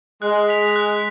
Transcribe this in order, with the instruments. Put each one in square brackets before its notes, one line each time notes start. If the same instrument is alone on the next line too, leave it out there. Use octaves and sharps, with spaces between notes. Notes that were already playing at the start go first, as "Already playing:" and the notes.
[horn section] G#3 [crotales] F#6
[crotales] B6 F7
F#6